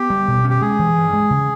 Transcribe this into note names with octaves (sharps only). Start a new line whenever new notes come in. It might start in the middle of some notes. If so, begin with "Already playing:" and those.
Already playing: B3 G4
G3
B2
C#4
G4
G#3 G#4
E3
G2
G#3
C#3